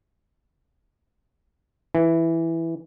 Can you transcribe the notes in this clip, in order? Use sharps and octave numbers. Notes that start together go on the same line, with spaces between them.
E3